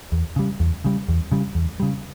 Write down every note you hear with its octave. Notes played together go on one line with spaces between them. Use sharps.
E2
C#3 G3
E2
C#3 G3
E2
C#3 G3
E2
C#3 G3